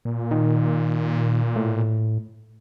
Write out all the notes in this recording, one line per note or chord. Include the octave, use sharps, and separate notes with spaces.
A#2
D#3
A2